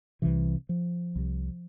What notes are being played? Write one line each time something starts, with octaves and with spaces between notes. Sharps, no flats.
C2 C3 E3
F3
C2 C3